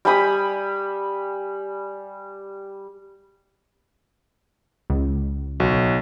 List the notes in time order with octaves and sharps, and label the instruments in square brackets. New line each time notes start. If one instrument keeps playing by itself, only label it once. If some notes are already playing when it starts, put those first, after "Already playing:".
[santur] G3 G#5 B5 D#6
[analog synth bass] C#2
[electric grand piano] B1 F#4